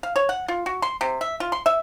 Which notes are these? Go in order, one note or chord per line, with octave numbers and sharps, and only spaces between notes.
F5
C#5
F#5
F4
F#4
C6
C3
E5
F4
C6
E5